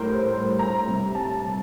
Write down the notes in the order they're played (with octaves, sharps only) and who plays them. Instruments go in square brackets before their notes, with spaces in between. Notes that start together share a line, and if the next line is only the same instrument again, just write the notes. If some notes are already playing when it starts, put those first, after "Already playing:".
Already playing: [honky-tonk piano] A2 G3 A#4 C5
A#5
C3 G3
A5